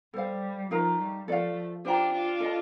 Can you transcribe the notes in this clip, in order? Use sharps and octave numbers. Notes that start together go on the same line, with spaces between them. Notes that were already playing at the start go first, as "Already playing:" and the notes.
G3 A4 C5 F5
F3 A3 D#4 A#4 F5 A#5
G3
F3 A3 A4 D5 F5
D4 F4 G4 C5 G5 A#5
D4 F4
A4 D#5 A5